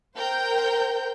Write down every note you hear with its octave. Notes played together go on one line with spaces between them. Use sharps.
A#4 C5 G5 G6